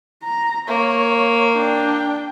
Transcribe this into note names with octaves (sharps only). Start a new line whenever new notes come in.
A#5
A#3 C#5
D4 G5